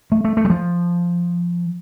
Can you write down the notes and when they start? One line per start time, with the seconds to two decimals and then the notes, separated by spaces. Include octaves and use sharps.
0.12 A3
0.24 A3
0.37 A3
0.45 G3
0.50 F3